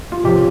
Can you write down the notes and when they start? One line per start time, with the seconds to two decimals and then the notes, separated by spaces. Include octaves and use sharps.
0.12 F4
0.24 F1 F2 C#3 F3 G4